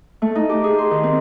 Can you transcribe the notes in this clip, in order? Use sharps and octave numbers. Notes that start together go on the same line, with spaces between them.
A3
D#4
G4
G#4
C6
D#3
C4